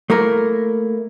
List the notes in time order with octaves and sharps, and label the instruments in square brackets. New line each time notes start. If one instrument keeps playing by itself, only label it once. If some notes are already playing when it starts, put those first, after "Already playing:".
[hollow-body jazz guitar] A3 A#3 E4 A#4